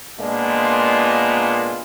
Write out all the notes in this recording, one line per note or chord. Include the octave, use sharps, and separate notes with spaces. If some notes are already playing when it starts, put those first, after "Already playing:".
A#2 G#3 A#3 B3 D4 F4